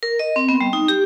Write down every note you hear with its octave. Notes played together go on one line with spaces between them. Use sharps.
A#4
D#5
C4
B3
G3
D#4
G4